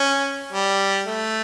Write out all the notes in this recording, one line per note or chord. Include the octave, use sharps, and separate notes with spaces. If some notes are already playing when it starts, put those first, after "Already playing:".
Already playing: C#4
G3
A3